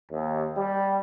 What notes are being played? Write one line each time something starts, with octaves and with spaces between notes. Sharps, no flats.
D#2
G3